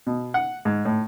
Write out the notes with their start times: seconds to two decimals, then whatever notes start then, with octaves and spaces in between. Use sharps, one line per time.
0.07 B2
0.34 F#5
0.65 G#2
0.85 A2